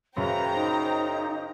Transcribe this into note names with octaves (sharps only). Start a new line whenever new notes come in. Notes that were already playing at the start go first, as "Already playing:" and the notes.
F#2 C#3 B4 C5 G5 A#5
D#4